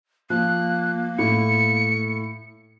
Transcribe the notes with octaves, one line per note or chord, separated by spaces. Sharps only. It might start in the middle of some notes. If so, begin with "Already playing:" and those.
F3 A#3 F#6
A2 C#7